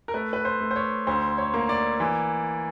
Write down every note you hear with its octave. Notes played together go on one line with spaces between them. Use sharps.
A#4
A3 B4
B4
C5
A3
C5
C#5
D2 C5
C#5
A#3
D5
E3